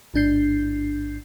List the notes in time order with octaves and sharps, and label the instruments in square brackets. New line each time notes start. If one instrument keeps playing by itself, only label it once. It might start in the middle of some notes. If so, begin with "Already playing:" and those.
[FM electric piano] A1 G#2 D4 G6 C7